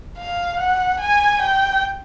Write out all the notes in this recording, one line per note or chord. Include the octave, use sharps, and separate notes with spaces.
F5
F#5
G#5
G5